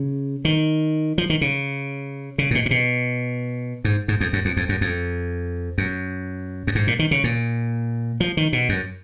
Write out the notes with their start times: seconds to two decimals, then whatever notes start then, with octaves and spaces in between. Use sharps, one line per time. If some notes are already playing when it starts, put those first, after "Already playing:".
Already playing: C#3
0.45 D#3
1.18 F3
1.30 D#3
1.41 C#3
2.38 C#3
2.51 A#2
2.55 B2
2.66 A#2
2.71 B2
3.85 G#2
4.08 G#2
4.21 F2
4.33 F#2
4.45 F2
4.57 F2
4.69 F#2
4.81 F2
5.78 F#2
6.67 F#2
6.75 G#2
6.87 A#2
6.99 D#3
7.11 C#3
7.24 A#2
8.20 F3
8.37 D#3
8.53 B2
8.69 F#2